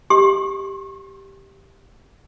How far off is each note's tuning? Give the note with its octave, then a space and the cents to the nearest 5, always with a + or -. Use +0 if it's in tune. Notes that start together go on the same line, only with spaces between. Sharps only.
G4 +0 C6 +30